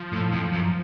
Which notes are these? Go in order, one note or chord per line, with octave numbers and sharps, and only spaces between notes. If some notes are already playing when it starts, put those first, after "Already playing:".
Already playing: F3
A2
F2
F#2